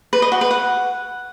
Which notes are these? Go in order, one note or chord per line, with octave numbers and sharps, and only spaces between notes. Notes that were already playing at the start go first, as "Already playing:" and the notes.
B4
D#5
F#4
B4
F#5